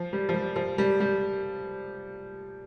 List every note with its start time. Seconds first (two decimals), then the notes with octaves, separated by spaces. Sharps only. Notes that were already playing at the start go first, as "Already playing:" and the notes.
Already playing: F3
0.13 G3
0.29 F3
0.34 G3
0.56 F3
0.78 G3
1.00 G3